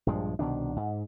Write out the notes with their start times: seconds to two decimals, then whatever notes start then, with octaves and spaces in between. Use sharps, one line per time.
0.07 A#1 G2 F3 G#3
0.39 C2 B2 D#3 D4
0.76 G#2